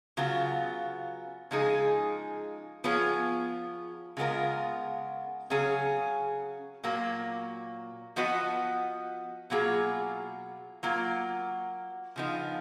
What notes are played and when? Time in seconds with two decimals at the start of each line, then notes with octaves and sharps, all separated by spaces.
0.17 C#3 F#3 B3 F4
1.51 C#3 F3 G#3 D#4 G#4
2.84 F3 B3 F4 G#4 C#5
4.17 C#3 G#3 B3 F4 A#4
5.50 C#3 F#3 C#4 G#4
6.84 A#2 F#3 A#3
8.16 F3 B3 F#4 B4 D#5
9.50 B2 F#3 A#3 F4 G#4
10.83 F#3 A#3 F4
12.16 C#3 F3 B3 D#4